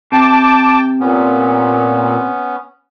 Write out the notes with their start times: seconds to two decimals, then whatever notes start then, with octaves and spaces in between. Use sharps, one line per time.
0.12 C3 G5 A5 D6
1.00 A#2 B3 C#4